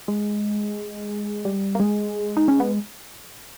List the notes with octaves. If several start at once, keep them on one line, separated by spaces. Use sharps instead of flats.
G#3
G3
A#3
G#3
D#4
C#4
B3